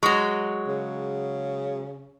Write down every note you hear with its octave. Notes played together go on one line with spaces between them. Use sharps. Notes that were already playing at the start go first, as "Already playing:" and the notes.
F#3 G#3 C#6
C#3